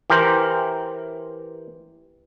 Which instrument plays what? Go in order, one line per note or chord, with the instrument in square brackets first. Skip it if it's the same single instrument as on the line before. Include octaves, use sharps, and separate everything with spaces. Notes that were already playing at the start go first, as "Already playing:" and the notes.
[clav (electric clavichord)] E3 G4 A#4 C5